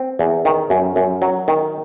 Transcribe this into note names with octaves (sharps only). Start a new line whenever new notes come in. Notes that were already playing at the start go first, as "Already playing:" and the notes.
Already playing: C4
E2
D#3
F#2
F#2
F#3
D#3